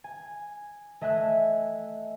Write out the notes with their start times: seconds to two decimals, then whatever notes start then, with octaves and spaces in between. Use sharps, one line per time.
0.04 G#5
1.01 A3 D#5 E5 G#5 F#6